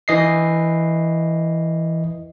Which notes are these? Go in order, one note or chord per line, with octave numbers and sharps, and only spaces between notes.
E3 D#5 C7